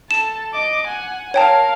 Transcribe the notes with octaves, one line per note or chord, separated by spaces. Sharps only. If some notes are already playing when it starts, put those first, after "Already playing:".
A4 A5 E7
D#5 D6
F#5 G#5
A#4 C#5 F5 G5 A5